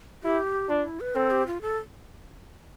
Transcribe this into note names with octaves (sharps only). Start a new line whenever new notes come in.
E4 G4
D4 F4
E4
B4
C4 A4
G4
F4
A4